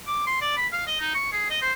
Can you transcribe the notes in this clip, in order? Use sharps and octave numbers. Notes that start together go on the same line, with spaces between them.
D6
C6
D5
B5
F5
D#5
D#4
C#6
G#4
D#5
C5